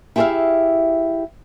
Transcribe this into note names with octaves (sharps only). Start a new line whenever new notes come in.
E4 G4 G#4 C5 E5 F5